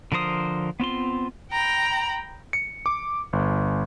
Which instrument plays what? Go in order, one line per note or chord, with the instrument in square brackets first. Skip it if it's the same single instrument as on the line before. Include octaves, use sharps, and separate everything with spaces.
[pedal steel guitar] D3 F3 A#4 C5 D#6
B3 C4 F4 C6
[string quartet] G5 A#5 B5
[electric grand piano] C#7
D6
G1